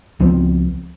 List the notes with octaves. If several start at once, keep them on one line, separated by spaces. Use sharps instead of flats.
C#2 F3 B3 C4